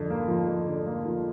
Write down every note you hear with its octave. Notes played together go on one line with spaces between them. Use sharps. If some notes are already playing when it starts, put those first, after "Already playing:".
Already playing: F2 D3
A#3
F3
F2
D3
A#3
F3